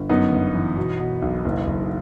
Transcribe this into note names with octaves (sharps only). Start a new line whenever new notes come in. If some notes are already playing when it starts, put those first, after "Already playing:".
Already playing: G1
F#2 B3 D#4
G1
E3
B2
B2
B1
F#1
F#1